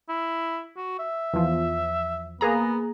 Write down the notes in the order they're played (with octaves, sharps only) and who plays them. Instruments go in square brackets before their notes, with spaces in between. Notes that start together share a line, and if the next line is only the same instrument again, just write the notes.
[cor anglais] E4
F#4
E5
[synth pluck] E2 F3
[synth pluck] A#3 G#4 A#5 [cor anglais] B3